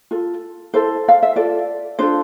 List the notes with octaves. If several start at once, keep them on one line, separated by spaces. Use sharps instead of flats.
F4 A4
E4 A4 C5
F5
E5
F4 A4 D5
D4 F4 A4 C5